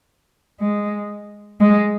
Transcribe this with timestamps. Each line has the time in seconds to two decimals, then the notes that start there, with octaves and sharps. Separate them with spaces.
0.61 G#3
1.60 G#3